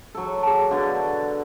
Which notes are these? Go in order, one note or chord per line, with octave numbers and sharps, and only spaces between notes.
F#3 A4
G#4 A5
B2 D3 F5